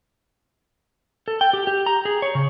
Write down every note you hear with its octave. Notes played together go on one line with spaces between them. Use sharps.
A4
G5
G4
G4
A#5
G#4
C#5
C#3